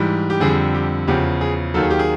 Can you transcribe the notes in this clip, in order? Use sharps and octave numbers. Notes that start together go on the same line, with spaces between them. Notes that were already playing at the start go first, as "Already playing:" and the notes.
Already playing: G#2 E3 G3
G4
F2 D3 G3 G#4
G4
E2 C#3 F3 G4
G#4
D#2 D#3 F#3 A4
G#4
G4
G#4